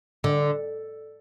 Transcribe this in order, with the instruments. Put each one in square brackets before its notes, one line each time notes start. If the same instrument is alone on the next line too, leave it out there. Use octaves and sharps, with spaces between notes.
[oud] D3